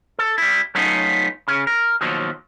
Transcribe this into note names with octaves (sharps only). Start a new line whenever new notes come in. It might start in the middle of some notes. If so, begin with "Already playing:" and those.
A4
G3 E4
F#3 A3 B3 C#4 D#4 F4
C#3 C#4
A#4
D#2 B2 F3 F#3